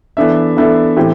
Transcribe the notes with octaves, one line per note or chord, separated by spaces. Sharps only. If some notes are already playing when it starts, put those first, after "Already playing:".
E3 B3 D4 A4 E5
E3 B3 D4 A4 E5
A2 E3 A3 C4 G4